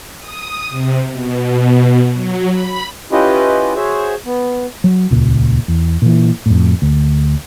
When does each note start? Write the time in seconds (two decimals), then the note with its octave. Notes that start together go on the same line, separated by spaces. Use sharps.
0.18 D#6
0.69 C3
1.11 B2
2.11 F#3
2.50 B5
3.12 C#4 E4 F4 G4 B4 D#5
3.76 F#4 G#4 C5 C#5 E5
4.26 B3
4.84 F#3
5.11 D#1 C#2 A#2
5.68 E2
6.02 A#2 E3
6.46 F2 A2
6.82 D2